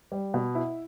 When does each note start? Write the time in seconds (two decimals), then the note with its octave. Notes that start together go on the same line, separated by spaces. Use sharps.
0.12 G3
0.34 B2
0.55 E4